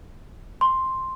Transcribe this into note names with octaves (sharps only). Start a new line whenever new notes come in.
C6